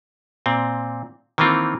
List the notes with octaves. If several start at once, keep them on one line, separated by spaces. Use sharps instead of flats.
A#2 C4
D#3 E3 A#3 C4 F4